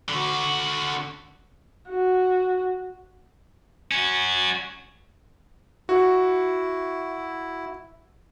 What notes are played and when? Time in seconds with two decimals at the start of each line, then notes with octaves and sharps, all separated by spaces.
0.09 D3 F#4
1.90 F#4
3.91 C#4 F#4
5.89 E4 F#4